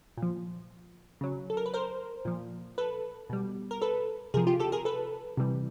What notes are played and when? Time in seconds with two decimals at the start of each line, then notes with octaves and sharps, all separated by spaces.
0.18 A#2
0.23 F3
1.21 C#3 F#3
1.50 A4
1.57 A#4
1.66 B4
1.74 A#4 C5
2.25 A#2 F3
2.78 A4 B4
3.30 B2 G3
3.71 A#4
3.82 A4 B4
4.34 C3 F3 G#4 A#4
4.47 F4 G4
4.60 G4 A4
4.72 G#4 A#4
4.85 A4 B4
5.37 C3 E3 G3